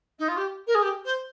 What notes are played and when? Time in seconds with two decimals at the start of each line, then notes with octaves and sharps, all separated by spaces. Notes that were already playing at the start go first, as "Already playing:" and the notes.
0.18 D#4
0.28 F4
0.36 G4
0.67 A#4
0.74 G#4
0.82 G4
1.04 C5